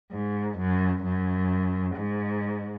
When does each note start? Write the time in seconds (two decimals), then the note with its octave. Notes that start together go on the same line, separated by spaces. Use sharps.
0.11 G#2
0.57 F#2
1.04 F#2
1.95 G#2